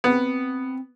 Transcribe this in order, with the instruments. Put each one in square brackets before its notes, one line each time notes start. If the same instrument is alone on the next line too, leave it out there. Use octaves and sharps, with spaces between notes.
[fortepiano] B3 [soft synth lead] C4